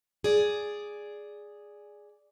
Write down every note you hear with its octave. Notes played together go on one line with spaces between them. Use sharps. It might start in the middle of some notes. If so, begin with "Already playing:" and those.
G#4 D5